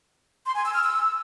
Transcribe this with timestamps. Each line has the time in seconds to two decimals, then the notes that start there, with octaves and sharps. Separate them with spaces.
0.46 C6
0.55 G#5
0.64 E6
0.73 F6
0.83 E6